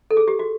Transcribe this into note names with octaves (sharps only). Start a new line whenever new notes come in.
A4
G#4
G4
F#4